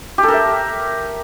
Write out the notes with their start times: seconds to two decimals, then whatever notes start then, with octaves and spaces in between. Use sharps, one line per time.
0.18 G4
0.23 A4
0.28 A#4
0.34 E5